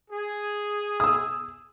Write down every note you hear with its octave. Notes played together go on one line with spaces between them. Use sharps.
G#4
D#6 E6